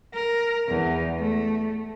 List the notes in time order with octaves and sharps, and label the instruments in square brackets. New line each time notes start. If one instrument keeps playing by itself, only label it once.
[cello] A#4
E2
A3